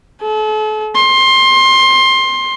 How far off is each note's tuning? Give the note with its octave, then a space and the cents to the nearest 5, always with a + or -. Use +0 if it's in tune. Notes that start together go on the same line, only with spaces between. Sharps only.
A4 -40
C6 +20